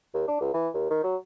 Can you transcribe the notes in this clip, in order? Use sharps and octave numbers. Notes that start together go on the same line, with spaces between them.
D#2
D4
C#2
E3
D#2
D#3
F#3